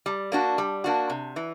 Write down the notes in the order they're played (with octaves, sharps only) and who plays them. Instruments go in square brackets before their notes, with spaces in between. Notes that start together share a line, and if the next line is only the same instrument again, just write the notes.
[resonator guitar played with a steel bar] G3
A#3 D4 F#4
G3
A#3 D4 F#4
C3
E3